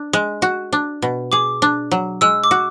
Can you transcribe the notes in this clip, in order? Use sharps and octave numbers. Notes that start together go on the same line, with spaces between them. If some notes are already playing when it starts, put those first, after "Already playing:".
Already playing: D4
G#3
F#4
D4
B2
G#4 D6
D4
F#3
G#3 E6
D6
F#4